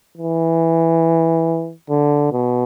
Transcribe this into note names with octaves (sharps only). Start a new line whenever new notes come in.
E3
D3
B2